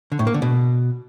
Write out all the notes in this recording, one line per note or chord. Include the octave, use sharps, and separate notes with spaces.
D3
A2
A#3
D3
B2